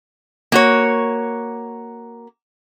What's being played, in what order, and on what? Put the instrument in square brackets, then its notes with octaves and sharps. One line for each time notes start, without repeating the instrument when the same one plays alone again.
[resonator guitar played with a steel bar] A#3 F#4 C#5